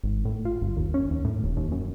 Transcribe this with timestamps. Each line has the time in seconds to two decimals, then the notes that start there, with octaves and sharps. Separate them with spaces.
0.04 G#1
0.25 A2
0.45 F4
0.61 G1
0.77 D#2
0.94 C#4
1.11 D#2
1.25 A2
1.43 D#1
1.57 D#2
1.72 F#2